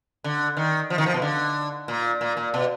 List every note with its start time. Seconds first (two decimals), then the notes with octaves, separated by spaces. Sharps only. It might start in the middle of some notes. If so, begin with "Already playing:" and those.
0.24 D3
0.57 D#3
0.90 F3
0.98 D#3
1.06 F3
1.14 B2
1.22 D3
1.88 A#2
2.21 A#2
2.37 A#2
2.54 B2